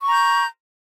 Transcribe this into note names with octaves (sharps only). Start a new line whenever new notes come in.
A#5 C#6 G6